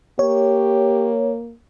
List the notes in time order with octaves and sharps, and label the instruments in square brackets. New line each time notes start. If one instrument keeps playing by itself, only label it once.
[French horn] A#3 [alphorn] G4 [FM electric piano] C#5